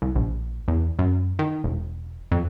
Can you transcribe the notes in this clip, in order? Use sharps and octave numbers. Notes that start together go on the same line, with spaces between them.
C2
A#1
E2
F#2
D#3
E1
F2